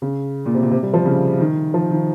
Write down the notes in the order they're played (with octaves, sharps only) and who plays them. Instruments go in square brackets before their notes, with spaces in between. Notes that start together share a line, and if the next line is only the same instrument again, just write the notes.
[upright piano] C#3
A#2
C3
A#2
C3
G3
F3
C#3
D#3
F3
D#3